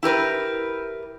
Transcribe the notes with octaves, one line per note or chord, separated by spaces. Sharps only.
E4 G4 A#4 B4